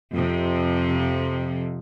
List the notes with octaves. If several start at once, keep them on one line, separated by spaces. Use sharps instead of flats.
F2 C3